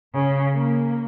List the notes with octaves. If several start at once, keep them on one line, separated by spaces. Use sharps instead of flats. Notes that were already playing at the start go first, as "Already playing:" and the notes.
C#3
A#3